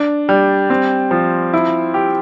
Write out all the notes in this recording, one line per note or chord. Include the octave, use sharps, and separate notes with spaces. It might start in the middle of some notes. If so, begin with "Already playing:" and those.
Already playing: D4
G3
C4
F3
E4
G4